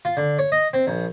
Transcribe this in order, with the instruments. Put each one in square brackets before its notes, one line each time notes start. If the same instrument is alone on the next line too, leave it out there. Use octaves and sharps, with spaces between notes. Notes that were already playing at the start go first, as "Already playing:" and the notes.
[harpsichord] F4
D3
C#5
D#5
C4
A#1